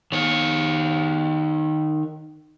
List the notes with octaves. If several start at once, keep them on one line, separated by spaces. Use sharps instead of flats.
D#3 C#5